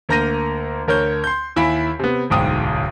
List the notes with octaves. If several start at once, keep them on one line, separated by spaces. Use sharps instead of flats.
D2 A#3 A#5 G6 A#6 D#7
D2 A#4 C#5 G6
C6 G6
D#2 E4 G#5 B5 B6 D7
C3 B3
D1 B1 G#2 G5 D#6